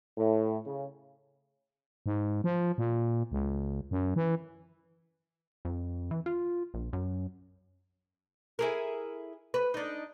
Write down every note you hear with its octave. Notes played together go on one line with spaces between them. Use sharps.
A2
C#3
G#2
F3
A#2
C#2
F#2
E3
F2
E3
F4
A#1
F#2
E4 G#4 A#4
B4
D4 D#4